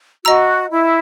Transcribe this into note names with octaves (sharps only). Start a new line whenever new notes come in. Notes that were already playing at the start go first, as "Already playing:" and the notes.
F#4 D#5 A#5 E6
E4